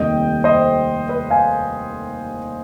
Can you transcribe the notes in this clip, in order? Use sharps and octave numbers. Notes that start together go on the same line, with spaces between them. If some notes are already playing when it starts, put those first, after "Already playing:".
Already playing: F1 D#2 D#3 G3 C4 D#5 G5
C5 D#5
B4
F5 G#5